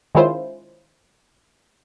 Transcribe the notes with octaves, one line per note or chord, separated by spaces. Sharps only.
D#3 G#3 C#4 E4 F4 C5